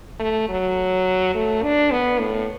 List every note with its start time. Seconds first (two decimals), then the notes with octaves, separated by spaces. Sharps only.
0.20 A3
0.49 F#3
1.34 A3
1.63 D4
1.91 B3
2.20 A2